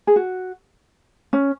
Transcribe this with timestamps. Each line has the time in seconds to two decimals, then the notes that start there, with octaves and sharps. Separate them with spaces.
0.07 G#4
0.16 F#4
1.33 C#4